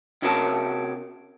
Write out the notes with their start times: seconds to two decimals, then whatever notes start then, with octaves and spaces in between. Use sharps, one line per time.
0.22 C3 C#4 F#4 A#4 C5 A5